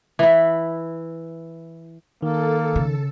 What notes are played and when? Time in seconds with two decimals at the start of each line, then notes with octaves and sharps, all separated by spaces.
0.19 E3 E4
2.23 D#3 A#3 A4
2.76 C#3